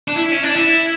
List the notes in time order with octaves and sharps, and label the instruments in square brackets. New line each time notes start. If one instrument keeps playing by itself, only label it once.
[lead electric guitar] D4
E4
C#4
D4
E4